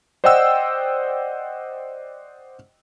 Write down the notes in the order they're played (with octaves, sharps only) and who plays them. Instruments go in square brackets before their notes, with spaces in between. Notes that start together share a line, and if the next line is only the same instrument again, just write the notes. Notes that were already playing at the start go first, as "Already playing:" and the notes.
[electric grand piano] C5 D5 D#5 F#5 G5 E6